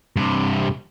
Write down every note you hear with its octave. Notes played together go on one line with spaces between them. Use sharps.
G2 C3